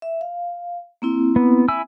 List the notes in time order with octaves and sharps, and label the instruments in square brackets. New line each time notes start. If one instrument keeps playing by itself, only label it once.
[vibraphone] E5
F5
A#3 C4 E4
[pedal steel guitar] B3
E4 G#5 E6